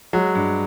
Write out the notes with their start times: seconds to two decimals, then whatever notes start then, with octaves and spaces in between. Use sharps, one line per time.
0.13 F#3 G#3
0.35 G2